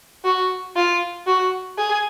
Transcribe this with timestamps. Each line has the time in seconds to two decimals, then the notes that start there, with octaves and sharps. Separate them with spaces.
0.25 F#4
0.76 F4
1.27 F#4
1.78 G#4